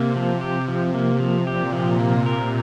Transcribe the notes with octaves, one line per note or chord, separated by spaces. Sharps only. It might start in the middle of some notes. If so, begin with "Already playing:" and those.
Already playing: C3 A#3
F3
G4
F3
A#3
F3
A#2 G4
F3
A#3
A#4